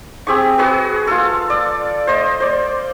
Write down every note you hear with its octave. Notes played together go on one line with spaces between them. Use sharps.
C4 G4 G#4 C#6
F#4 G#4 B4 C5
F4 A4
D5
C5 D#5
C5 D5